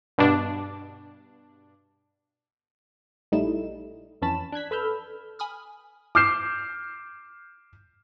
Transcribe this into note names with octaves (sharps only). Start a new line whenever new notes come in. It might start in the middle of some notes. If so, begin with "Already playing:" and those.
G2 B2 D4
A#1 G3 A3 D#4 E4 E7
F2 E3 C#4 A5 B5 E7
D4 F#6 G#6 B6
A4 B4 B5 E6 F6 G6
G#5 B5 D#6 F6
D6 F6 G6 C7 E7